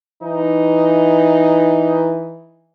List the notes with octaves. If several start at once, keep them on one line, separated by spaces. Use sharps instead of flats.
E3 D#4